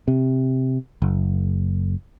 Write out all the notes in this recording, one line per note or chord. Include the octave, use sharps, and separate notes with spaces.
C3
F#1